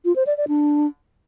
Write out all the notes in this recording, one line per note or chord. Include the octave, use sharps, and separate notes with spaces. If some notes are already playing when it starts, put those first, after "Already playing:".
F4
C5
D5
D5
D4